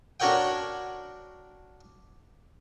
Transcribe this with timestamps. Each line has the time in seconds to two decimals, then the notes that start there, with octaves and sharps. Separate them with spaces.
0.20 D4 F#4 A#4 C#5 F#5 G5